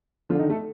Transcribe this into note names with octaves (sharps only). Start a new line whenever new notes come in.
D3 F3 F4
D#3 D#4
A3 A4